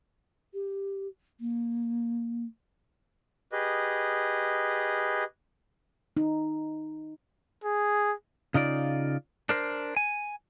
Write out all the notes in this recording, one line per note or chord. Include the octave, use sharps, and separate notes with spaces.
G4
A#3
G4 G#4 B4 D#5
D#4
G#4
C#3 D#4 F4 D5
D4 A#4 C5
G#5